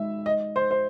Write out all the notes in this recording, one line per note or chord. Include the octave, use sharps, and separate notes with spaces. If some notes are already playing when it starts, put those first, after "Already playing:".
Already playing: G#3 D#4 E5
D#5
C5
C5